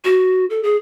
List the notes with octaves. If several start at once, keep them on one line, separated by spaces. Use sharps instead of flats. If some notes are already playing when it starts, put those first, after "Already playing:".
F#4
A4
G#4